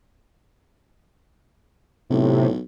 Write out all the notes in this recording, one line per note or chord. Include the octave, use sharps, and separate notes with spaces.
B1 A2 C3